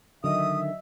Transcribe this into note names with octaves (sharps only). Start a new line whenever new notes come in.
D3 D#3 F#3 D#5 E5 D#6